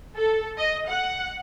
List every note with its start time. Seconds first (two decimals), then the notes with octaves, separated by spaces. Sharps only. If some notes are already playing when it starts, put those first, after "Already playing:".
0.14 A4
0.57 D#5
0.88 F#5